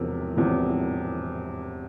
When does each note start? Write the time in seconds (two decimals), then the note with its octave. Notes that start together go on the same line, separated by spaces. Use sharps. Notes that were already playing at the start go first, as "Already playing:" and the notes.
Already playing: E1 E2 C3 F3 A#4
0.37 E1 E2 C3 F3